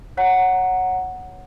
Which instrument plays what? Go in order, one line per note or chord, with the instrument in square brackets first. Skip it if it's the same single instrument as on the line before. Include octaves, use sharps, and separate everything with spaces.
[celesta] C#5 F#5 A#5